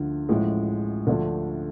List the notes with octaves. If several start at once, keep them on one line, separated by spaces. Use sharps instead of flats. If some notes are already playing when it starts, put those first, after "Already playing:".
Already playing: D2 D3 F3
A1 A2 F3 G#3
D2 D3 F3 A3 D4